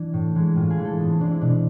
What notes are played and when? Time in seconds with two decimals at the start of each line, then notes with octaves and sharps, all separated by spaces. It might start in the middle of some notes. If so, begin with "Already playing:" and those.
Already playing: E3 D4
0.14 A2
0.35 E3 G#3
0.56 A2 F4
0.70 G#4
0.77 E3 G#3
0.85 A4
0.99 A2 B3
1.10 C4
1.20 E3 G#3 D4
1.31 E4
1.41 B2 D4